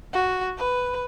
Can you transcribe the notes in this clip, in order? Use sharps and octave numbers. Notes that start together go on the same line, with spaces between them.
F#4
B4